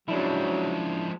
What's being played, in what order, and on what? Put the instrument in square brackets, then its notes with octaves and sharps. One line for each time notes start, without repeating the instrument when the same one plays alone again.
[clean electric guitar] C#3 D4 E4 [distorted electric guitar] F3 G#3 [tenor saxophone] F#3